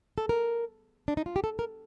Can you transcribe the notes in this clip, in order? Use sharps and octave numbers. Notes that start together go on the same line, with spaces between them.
A4
A#4
D4
D#4
F4
G4
A4
A#4